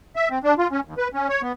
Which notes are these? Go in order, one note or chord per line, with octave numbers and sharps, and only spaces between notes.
E5
C4
D4
F4
C#4
D#2
B4
C#4
C#5
B3